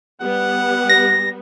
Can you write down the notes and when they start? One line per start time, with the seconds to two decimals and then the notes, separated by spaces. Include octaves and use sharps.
0.21 G3 B3 F#5
0.89 A#6